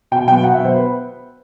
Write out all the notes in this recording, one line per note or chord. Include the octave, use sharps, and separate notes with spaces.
B2 G5
F#3 B3 G5
B2 F#5
E5
F#3 B3
C5
B4